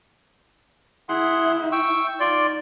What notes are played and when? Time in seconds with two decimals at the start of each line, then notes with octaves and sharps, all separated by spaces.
1.09 E4 G#4 F#5 C6
1.72 G5 C#6 E6
2.20 D#4 F4 D5 C6